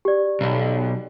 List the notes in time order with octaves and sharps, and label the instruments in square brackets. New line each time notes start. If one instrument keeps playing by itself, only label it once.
[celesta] G4 D5
[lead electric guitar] B1